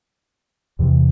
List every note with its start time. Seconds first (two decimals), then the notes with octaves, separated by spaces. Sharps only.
0.79 E2 C3 E3